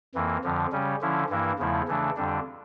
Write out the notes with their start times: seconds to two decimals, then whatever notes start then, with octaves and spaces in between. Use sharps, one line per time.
0.15 F2 E3 A#3
0.44 F2 D3 F3
0.72 C#3 G3 C#4
1.01 D3 F3 C#4 E4
1.29 G2 E3 A#3 E4
1.59 E2 C#3 F3 A3 E4
1.88 C#3 E3 A3 D4
2.16 F2 D3 G3 D4